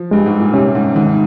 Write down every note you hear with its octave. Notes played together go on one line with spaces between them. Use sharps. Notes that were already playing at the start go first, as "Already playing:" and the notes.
Already playing: F3
G2 G#3
G#2
A#2
C3 C#4
G#2
G#2 D#3